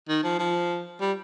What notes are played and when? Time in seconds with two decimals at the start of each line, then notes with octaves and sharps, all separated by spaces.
0.08 D#3
0.23 F3
0.39 F3
1.01 G3